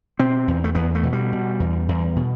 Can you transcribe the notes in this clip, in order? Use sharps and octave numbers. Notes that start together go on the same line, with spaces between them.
B2 C4
E2
A3
E2 B3
A3
B2
G3
B2
E2
E2
B2